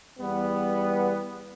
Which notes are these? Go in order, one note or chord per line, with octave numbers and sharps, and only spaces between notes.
E2 G3 B3